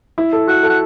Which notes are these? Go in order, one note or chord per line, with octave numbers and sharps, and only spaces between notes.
E4
A4
F#4 F#5
A4
F#5